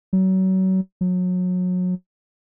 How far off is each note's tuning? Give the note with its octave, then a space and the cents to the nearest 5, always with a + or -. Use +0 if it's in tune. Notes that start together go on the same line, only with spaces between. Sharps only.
F#3 +30
F#3 -30